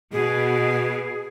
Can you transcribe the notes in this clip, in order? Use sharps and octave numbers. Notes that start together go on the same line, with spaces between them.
B2 G#4